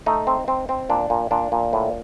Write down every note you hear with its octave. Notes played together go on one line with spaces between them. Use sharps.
A3 D#4
C4
C4
C4
A#2 D4
A#2
A#2 D4
A#2
A2